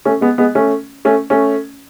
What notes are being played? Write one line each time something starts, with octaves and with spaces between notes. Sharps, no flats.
A3 C#4
G#3 B3
G#3 B3
A3 C#4
A3 C#4
A3 C#4